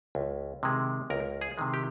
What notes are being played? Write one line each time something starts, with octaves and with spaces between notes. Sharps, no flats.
C#2
C3 D#3 G#3
C#2 A#4
G#4
C3 D#3 G#3
G4